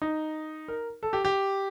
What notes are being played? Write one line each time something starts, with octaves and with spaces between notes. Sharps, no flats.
D#4
A#4
A4
G4
G4